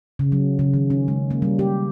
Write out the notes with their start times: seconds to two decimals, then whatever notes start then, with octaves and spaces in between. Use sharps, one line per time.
0.19 C#3
0.32 F#3
0.59 C#3
0.74 D#3
0.90 C#4
1.08 G#3
1.31 A#3
1.42 G3
1.59 G4